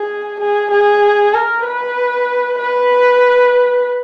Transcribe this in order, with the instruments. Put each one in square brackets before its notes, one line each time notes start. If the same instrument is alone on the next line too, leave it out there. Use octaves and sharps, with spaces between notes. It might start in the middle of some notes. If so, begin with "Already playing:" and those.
Already playing: [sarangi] G#4
G#4
G#4
A#4
B4
B4